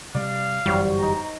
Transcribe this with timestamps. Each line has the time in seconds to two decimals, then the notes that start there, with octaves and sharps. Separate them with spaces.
0.15 C3 G3 D5 F5
0.66 G1 F#2 E3 G3 F#4 C5 C#5
0.99 D#4 G5 A#5